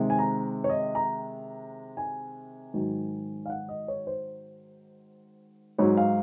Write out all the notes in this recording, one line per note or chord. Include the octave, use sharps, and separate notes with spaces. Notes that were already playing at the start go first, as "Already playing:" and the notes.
Already playing: C3 D#3 G#3
G#5
A#5
C#5
D#5
A#5
G#5
G#2 D#3 F#3
F5
F#5
D#5
C#5
C5
G#2 F#3 C#5
F5